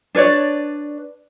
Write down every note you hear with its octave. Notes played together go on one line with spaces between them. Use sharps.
D4 B4 C#5 D5